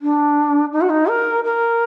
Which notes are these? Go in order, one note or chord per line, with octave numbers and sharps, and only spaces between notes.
D4
D#4
F#4
D#4
A#4
A#4